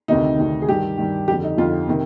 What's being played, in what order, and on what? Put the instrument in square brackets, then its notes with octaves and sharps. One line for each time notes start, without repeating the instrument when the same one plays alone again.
[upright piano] D2 C3 D#3 D#4
D2 C3 D#3
G#4
G2 D#3 G4
G2 D#3
F2 D3 G4
D#4
F2 D3 F4
C3 D#3